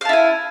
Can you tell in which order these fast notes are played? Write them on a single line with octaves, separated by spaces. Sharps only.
F5 A5 E4 G#5